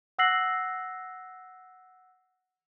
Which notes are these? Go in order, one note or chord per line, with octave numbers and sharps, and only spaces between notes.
F#5 E6 F#6 A#6 C7 F#7